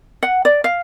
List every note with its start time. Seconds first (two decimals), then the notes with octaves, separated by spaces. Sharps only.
0.23 F#5
0.45 D5
0.64 F5